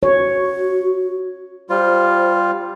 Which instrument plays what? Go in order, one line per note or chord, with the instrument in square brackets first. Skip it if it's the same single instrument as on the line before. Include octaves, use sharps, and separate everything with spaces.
[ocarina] F#4 [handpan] C#5
[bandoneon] G3 F4 [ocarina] C5